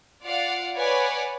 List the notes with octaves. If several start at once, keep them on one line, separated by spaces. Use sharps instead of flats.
F4 D5 F5 F#5
B4 C#5 D5 F#5 G#5